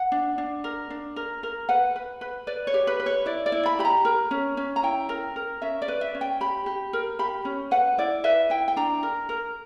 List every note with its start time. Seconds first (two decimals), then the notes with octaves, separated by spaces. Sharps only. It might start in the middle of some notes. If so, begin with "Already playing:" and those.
Already playing: F#5
0.12 D4
0.38 D4
0.64 A#4
0.90 D4
1.16 A#4
1.43 A#4
1.69 B4 F#5
1.96 B4
2.21 B4
2.47 B4 D5
2.67 C#5
2.74 G4
2.87 B4
3.00 B4
3.06 C#5
3.26 E4 D5
3.46 D5
3.52 E4
3.66 B5
3.79 G4 B5
3.85 A#5
4.05 A#4
4.31 C#4
4.57 C#4
4.76 A#5
4.83 E4 G5
5.09 A#4
5.36 A#4
5.62 C#4 E5
5.82 D5
5.88 B4
6.01 E5
6.14 C#4
6.21 G5
6.41 G4 B5
6.66 G4
6.93 A#4
7.19 G4 B5
7.45 C#4
7.71 B4 F#5
7.98 E4 D5
8.24 B4 E5
8.50 E4 G5
8.68 G5
8.76 D4 A#5
9.03 A#4
9.29 A#4